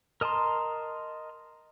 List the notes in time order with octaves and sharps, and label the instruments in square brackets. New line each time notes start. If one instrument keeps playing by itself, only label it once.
[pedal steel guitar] A#4 D#5 A5 A#5 C6